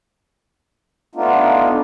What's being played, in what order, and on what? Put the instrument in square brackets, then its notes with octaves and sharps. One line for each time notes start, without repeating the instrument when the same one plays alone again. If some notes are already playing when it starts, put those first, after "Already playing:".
[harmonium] A3 B3 D4 D#4 F4